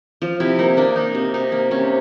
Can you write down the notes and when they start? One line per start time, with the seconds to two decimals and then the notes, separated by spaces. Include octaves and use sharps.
0.22 F3 F4
0.40 C3 E4
0.59 A#3 D#4
0.77 A#3 D4
0.96 A#3 D#4
1.15 C3
1.34 C3 D#4
1.52 A#3
1.71 C3 C#4